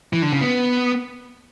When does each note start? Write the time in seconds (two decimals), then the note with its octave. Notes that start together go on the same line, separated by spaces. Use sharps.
0.13 E3
0.22 D3
0.32 C#3
0.41 B3